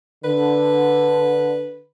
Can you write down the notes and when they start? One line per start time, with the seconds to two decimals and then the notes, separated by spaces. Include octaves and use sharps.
0.24 D3 B4